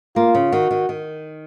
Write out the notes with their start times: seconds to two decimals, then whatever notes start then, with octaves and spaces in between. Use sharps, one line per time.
0.16 A#3 F4
0.35 C#3
0.52 D#3 F#4
0.71 D#3
0.89 D#3